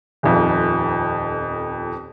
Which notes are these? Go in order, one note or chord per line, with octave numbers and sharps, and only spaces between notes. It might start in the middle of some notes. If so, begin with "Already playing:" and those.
D#1 F2